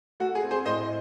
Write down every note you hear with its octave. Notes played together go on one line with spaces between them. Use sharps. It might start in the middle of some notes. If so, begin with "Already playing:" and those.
A3 F#4
G#4
C4
G#4 C5
A2 C5 D#5